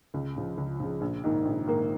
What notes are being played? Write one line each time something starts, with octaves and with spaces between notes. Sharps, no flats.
C#2
C#3 F3
C#2
C#3 F3
A#1
G#2 D#3 A#3
A#1
G#2 D#3 A#3